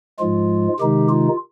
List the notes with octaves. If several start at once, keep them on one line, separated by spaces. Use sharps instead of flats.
G#2 F3 G#3 F4
C3 D#3 G#3 D#4 G4
F4